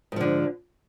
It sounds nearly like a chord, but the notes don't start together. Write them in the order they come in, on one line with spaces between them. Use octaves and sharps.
G#2 F3 D3